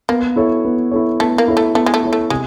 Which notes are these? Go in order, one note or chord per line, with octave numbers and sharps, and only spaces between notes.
A#3 B3
E4 A4 C#5
B3
E4 A4 C#5
A3 B3
A#3
E4 A4 C#5
A3
A3 B3
G#3
A3
E4 A4 C#5
A3
C3 G#3